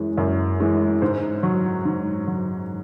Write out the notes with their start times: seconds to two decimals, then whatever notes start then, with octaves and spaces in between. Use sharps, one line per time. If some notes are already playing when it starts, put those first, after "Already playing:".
Already playing: F#2 E3 G#3
0.18 F#2
0.60 E3 G#3
1.02 G#2 C5
1.43 F#3
1.85 G#2
2.27 F#3